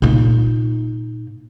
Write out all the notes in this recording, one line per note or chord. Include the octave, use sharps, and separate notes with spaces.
A#2 D#4